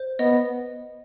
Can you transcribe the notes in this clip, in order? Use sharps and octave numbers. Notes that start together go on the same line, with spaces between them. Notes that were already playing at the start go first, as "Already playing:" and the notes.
Already playing: C5
B3 D#5